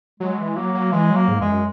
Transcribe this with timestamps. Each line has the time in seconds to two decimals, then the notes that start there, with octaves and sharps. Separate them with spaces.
0.20 F#3 G#3
0.38 E3
0.56 F#3 A#3
0.74 F#3
0.92 E3 G#3
1.11 F#3 A#3
1.28 G#2
1.40 E2 G#3
1.46 F#2